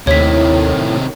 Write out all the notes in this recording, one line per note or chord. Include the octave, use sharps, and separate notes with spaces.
D#2 A2 C3 D#3 C#5 B6